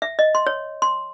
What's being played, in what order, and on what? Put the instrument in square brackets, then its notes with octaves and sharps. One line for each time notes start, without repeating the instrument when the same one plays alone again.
[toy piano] E5
D#5
C6
C#5
C6